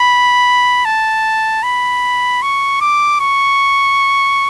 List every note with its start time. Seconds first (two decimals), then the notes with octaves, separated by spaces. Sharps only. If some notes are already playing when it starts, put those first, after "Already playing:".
Already playing: B5
0.85 A5
1.63 B5
2.42 C#6
2.81 D6
3.21 C#6